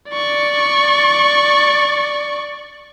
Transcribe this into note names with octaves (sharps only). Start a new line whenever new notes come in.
D5 C#6